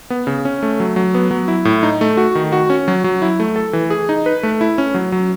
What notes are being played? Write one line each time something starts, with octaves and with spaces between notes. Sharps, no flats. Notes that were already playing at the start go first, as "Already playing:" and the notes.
B3
C#3
C#4
A3
F#3
F#3
B3
F#3
E4
A2
D#4
A3
F#4
D#3
F#4
C#4
F#3
F#3
E4
A3
A4
E3
G#4
D#4
B4
A3
E4
C#4
F#3
F#3